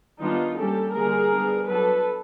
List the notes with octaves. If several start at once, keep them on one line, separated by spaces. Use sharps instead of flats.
D#3 G3 B3 D4 D#4 F4
G3 A#3 C#4 G4 A4
D3 G3 A#3 G#4 A#4
G3 B3 D4
F#3 B3 D4 A4 B4